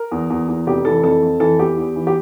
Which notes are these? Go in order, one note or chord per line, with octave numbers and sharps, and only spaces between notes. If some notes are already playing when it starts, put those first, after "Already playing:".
Already playing: A#4
E2
E2
E2
F1 G4
E3 A4
F2 A4
F2
E3 A4
E2 G4
E2
E3
G4